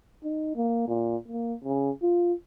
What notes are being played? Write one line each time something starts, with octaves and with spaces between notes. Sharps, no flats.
D#4
A#3
A#2
A#3
C#3
F4